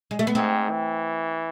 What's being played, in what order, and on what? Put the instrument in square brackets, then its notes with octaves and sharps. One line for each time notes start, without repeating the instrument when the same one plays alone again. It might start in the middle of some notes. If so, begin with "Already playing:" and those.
[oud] G#3
A3
B3
[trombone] G#2 [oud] C4
[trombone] E3